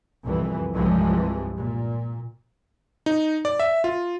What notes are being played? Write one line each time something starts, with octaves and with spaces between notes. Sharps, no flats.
C2 F2 E3
C2 G2 C3 E3 F3 G#3
A#2
D#4
D5
E5
F4